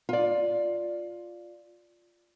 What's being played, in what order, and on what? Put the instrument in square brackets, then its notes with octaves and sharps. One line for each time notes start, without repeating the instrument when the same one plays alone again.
[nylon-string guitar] F4 D5